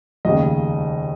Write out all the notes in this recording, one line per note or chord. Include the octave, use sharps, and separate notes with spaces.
F1 D#2 C#3 D#5